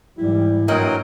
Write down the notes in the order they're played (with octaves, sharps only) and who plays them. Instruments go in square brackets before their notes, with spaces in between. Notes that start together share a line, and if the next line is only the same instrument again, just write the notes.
[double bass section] G#2 E3 G3 [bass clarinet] E4
[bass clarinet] G2 [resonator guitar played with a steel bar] A#2 E4 D#5 [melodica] F#3 A#4 G5 [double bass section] A#3